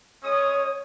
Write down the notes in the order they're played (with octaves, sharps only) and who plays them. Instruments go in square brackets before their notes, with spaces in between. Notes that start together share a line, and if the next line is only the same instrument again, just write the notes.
[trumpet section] G#3 C#4 D#6 [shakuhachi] C#5